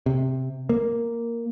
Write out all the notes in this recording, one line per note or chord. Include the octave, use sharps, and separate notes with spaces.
C3
A#3